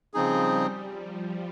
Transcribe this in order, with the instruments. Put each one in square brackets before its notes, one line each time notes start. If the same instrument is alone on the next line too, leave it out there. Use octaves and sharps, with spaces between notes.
[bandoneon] C#3 F3 C4 D#4 G#4 [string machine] G3
[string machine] F3